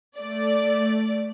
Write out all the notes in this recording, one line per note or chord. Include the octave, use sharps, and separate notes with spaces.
A3 D5